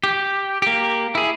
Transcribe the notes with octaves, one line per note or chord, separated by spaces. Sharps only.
G4
A#3 G4
E4 G#4